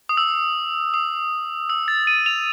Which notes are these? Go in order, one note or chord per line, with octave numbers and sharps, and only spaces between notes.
D#6
E6
D#6
E6
A6
D#7
F7